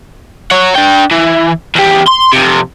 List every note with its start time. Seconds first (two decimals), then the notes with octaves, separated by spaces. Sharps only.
0.51 C#5 F#5
0.75 D4 G5
1.11 E3
1.75 E2 G4
2.07 C6
2.33 F2 C3